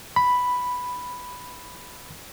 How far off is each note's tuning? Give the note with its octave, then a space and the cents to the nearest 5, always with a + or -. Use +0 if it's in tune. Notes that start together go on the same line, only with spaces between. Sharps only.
B5 +0